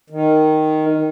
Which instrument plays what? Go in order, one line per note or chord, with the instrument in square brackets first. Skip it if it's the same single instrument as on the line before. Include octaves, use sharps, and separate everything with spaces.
[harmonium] D#3